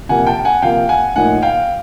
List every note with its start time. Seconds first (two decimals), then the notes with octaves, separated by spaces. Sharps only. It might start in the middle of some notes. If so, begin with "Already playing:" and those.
0.09 C3 F3 A#3 F#5 G#5
0.27 G5 A5
0.39 G5
0.45 F#5 G#5
0.62 C3 F3 A#3 F5 G5
0.89 F#5 G#5
1.16 A2 F3 A#3 D#4 F#5 G#5
1.42 F5 G5